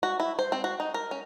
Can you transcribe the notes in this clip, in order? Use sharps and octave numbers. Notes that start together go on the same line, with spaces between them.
F#4
E4
C5
C4
F#4
D#4
A#4
C#4